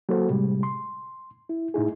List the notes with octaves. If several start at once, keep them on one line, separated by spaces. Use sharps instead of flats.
F#3 A#3 F#4 A4 C5
A2 C3 G3 G#3
C6
E4
A2 D#4 E4 G#4